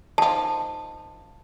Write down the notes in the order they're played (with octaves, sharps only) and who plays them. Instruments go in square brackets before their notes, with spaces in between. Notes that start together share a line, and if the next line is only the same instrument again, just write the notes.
[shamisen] D#3 F3 [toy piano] A5